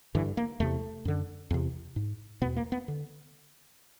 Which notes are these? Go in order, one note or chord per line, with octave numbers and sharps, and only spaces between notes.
G2 D3 E3
A#3
E2 C3 A3
F#2 D3
E2 C3
G#2
E2 B2 B3
A#3
B3
D3